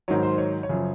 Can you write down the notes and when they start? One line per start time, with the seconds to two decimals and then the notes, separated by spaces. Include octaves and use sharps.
0.08 G#2 D#3 F#3 C#5
0.23 C5
0.38 C#5
0.63 C#5
0.69 F#2 C#3 F3